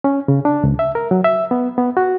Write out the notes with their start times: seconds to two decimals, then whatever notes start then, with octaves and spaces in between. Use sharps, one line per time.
0.04 C#4
0.28 C#3
0.45 D4
0.64 C#2
0.79 E5
0.95 A#4
1.11 F#3
1.24 E5
1.51 B3
1.78 B3
1.97 F#4